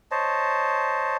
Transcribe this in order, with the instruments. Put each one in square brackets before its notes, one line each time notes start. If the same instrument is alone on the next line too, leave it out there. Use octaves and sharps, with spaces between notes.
[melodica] C5 C#5 D#5 A5